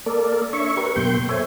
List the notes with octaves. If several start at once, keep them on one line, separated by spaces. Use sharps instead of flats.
A#3 A4 A#4 D5
D4 C#5 E5 C#6
G4 A#4 B4 C#6
F#2 B2 A#3 G5 C6 G6
A4 C5 C#5 E5 G#5